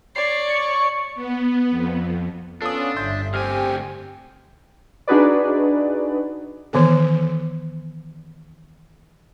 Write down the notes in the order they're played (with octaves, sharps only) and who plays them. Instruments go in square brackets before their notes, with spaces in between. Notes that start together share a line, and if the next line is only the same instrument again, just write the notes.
[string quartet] C#5 D5 [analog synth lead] C7
[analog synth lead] C#6
[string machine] B3
F2
[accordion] B3 C#4 F4 [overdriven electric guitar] D4 [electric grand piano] A4 D#6
[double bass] G1 [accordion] E5 [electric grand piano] C6 G6
[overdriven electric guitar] D2 G#5 [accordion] C4 G4 [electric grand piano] F6
[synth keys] D4 D#4 F#4 G#4 B4 D5
[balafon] D#3 E3 B3 A4